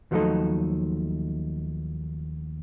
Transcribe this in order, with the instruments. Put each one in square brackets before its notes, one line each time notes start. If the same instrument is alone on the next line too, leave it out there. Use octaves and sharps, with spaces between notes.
[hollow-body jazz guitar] D#2 F3 F#3 A3 D#4 A4